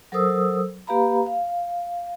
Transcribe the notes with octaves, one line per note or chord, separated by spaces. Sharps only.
F#3 A4 A#4 C5 D#6 E6
A#3 G4 B4 F5 A#5 B5
F5